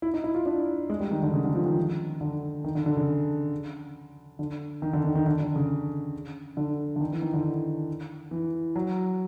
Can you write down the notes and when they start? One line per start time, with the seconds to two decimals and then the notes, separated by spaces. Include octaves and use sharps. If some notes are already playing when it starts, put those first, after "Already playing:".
0.02 E4
0.14 D#4
0.24 E4
0.35 F4
0.46 D4
0.90 G#3
1.00 G3
1.11 D#3
1.23 D3
1.34 C#3
1.44 D3
1.55 F3
1.66 D#3
2.21 D3
2.64 D#3
2.75 D3
2.86 D3
2.97 C#3
4.39 D3
4.82 D#3
4.93 D3
5.04 D#3
5.15 D#3
5.26 D3
5.41 D3
5.56 C#3
6.57 D3
6.96 D3
7.01 D#3
7.11 E3
7.22 D#3
7.33 D3
8.31 E3
8.76 F#3